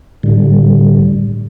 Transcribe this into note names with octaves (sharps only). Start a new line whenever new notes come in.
A2 D3 G3